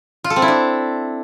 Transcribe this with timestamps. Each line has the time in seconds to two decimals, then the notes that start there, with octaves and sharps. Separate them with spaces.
0.24 F4
0.30 A4
0.36 C4
0.42 E4
0.48 D4